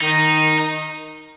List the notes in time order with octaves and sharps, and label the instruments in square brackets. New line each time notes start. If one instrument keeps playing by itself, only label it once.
[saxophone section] D#3 [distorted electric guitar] D#4